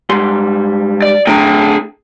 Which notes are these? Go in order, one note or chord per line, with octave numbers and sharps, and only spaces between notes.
G#2 G3 C6
D5
A2 D3 G#4 G5 A#5